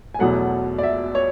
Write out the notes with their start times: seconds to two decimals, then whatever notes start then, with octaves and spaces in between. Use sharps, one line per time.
0.14 G#5
0.19 E2 B2 F#3 A3 F#5
0.78 D5
0.83 E5
1.15 C#5